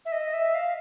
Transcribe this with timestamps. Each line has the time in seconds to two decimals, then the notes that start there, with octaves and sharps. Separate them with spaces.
0.05 E5
0.12 D#5
0.33 E5
0.55 F5